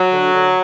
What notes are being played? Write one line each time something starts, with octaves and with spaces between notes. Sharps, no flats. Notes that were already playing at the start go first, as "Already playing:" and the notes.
Already playing: F#3
D3
D3